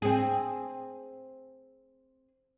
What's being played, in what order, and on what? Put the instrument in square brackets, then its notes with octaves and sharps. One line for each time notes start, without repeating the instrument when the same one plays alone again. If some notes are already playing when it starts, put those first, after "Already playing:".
[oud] C4 G#4